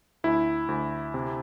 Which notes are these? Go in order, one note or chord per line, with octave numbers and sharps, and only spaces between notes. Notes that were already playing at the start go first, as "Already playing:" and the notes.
D2 E4
D2
C3